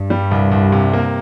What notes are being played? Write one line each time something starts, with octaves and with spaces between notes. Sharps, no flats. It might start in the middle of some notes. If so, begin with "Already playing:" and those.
Already playing: G2
G3
C2
C2
C3
A#3